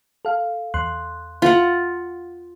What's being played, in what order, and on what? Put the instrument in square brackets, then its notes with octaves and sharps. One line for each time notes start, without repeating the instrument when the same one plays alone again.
[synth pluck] A4 F5
E2 C6 F#6
[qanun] F4 F#5